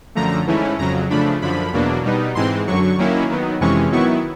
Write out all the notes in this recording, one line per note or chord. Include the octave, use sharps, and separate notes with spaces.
F#2 D3 F3 A3 A#5
G#2 E3 A3 C#4 E4
F2 C#3 F#3 A#5
C#3 F3 A3 D4 B5
F#2 D3 F3 B5
E2 B2 F#3 A#3 D4
B2 G3 B3 D#4
G#2 E3 G#3 C4 C6
F#2 D3 F#3 C#6
D#3 F#3 A#3 C#4 E4
D#3 F#3 B3
F2 C3 E3 G#3 C#4 C#6
D#3 F#3 B3 E4 C#6